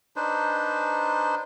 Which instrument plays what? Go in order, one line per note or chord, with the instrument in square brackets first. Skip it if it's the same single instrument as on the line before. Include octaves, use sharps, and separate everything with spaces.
[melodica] D4 D#4 B4 C5